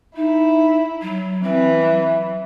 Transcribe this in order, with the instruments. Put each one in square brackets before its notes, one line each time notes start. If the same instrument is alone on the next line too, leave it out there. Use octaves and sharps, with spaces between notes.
[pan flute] D#4 [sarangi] E4
[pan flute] F#3
[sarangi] E3 [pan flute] C4
[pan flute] F#3